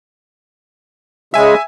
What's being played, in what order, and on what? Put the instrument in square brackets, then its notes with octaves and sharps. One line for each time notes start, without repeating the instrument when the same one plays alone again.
[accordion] C#3 G#3 [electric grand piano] E5 G#5